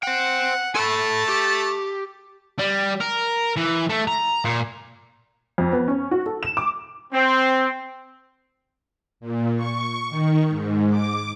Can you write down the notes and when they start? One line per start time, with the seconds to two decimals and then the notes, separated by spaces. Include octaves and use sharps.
0.03 C5 F#5 G5
0.76 A3 A4 A5 B5
1.29 G4
2.59 G3
3.00 A#4
3.57 E3
3.90 A3
4.08 A#5
4.45 A#2
5.58 F2
5.73 B3
5.88 C#4
6.11 F#4
6.26 A4
6.43 E7
6.57 D6
7.12 C4
9.20 A#2
9.56 C#6
10.10 D#3
10.49 G#2
10.90 D6